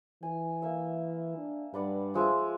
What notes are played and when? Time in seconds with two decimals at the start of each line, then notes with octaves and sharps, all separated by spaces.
0.23 E3 G#5
0.62 A#3 E5
1.38 D4
1.74 G2 B4 D5 F#5
2.14 F3 G#3 E5